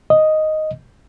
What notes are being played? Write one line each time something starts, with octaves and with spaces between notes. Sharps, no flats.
D#5